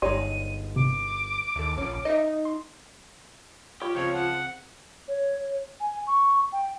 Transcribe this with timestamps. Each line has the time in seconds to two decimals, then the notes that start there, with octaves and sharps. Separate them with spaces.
0.02 G1 G#3 D#4 G4 C#5 D5 C6 D#7
0.76 C3 D6
1.56 D#2 E3 A4
1.78 A#1 F3 C#4
2.05 D#4 D#5 E5
2.45 C6
3.82 F4 G4 C#5
3.95 C#2 F3 C4 C#5
4.14 F#5
5.08 C#5
5.80 G#5
6.07 C#6
6.53 G5